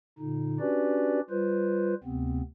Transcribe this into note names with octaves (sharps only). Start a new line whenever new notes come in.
A#2 D3 D#4
C#4 D4 F#4 G4 B4 D5
G3 F4 B4 C5
D2 C3 B3 C4